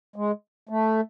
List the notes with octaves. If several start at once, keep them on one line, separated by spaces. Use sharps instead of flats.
G#3
A3